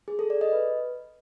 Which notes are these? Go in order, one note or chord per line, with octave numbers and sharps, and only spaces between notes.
G#4
A4
D5
D#5
B4